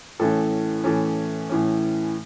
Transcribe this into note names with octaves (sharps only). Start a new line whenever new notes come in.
A2 E3 C#4 A4
A2 E3 C#4 A4
A2 E3 C#4